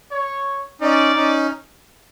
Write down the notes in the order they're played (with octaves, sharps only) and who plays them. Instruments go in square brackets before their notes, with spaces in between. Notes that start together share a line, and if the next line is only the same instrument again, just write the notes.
[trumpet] C#5
[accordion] C#4 D#4 [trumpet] D5
[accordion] C#4 D#4